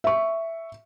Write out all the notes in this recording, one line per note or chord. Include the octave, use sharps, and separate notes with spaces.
E5 C#6